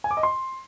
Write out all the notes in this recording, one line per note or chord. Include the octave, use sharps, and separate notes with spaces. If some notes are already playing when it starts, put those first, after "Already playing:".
G#5
D6
D#5
C6